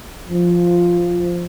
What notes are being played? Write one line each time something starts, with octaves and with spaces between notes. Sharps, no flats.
F3